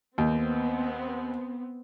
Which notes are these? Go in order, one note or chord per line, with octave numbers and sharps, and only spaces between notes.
D#2 B3 C4